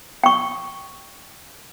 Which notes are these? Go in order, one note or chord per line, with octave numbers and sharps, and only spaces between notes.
G5 C#6